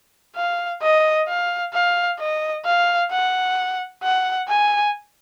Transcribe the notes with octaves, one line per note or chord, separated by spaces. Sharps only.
F5
D#5
F5
F5
D#5
F5
F#5
F#5
G#5